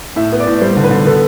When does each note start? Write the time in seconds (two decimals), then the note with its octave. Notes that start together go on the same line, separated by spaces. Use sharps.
0.16 A2 E5
0.32 B3
0.40 D5
0.47 A2
0.61 G3 C5
0.77 D3
0.84 B4
0.91 D3
1.06 B3 A4